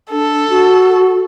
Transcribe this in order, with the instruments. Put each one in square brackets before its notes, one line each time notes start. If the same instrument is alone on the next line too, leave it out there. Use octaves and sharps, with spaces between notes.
[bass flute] D4 [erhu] A4
[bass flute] F#4